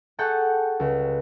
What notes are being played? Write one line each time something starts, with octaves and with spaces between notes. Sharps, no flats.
G#4 A4 F#5 G5 C#6
C#2